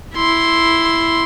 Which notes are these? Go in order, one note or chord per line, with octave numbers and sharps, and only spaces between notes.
E4 C6